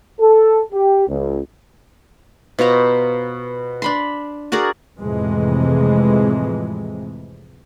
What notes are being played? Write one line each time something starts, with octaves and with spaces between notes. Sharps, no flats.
A4
G4
C#2
B2 F4 C5 A#5
D4 B5 C6
F#4 G#4 A#4 D5
F2 A2 C3 E3 G#3